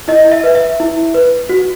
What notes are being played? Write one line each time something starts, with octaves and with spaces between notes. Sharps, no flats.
E4 D#5
E5
B4
E5
E4
B4
F#4